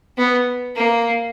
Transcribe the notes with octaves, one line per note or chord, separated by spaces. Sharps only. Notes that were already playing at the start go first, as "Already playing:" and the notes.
B3
A#3